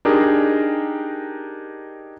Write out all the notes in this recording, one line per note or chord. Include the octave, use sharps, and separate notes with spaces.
D4 D#4 G4 G#4 A#4